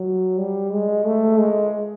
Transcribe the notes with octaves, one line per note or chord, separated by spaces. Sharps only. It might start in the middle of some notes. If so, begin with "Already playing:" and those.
Already playing: F#3
G3
G#3
A3
G#3